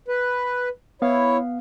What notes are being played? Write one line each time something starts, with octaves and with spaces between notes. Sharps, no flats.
B4
B3 E4 C#5 F5